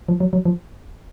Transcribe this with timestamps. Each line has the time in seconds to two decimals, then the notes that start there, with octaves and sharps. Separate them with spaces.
0.09 F3
0.20 F#3
0.33 F#3
0.45 F3